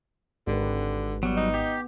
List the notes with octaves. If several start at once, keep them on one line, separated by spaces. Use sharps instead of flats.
G#1 D3 G4 B4
F#3 G3 B3
D#4
G4